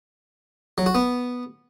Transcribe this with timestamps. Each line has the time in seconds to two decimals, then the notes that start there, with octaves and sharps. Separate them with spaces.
0.78 F#3
0.86 F#4
0.95 B3